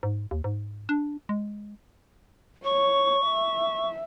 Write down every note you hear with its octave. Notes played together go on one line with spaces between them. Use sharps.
G#2
D#2
G#2
D4
G#3
C#5 C#6
E5